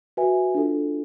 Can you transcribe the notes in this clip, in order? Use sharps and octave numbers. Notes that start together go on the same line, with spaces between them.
F#4 B4 E5 G#5
D4 F4 A4